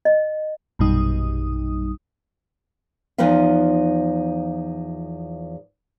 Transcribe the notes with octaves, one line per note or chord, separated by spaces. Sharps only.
D#5
A#1 F#2 B2 G3 D#4 D#6
E2 F3 D#4 F4 B4 F5